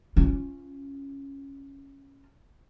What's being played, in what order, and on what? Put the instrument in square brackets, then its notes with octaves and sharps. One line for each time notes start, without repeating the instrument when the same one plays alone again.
[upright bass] C#4 F4